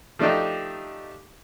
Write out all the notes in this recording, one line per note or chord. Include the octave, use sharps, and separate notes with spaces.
F3 A3 D4 D#4 G4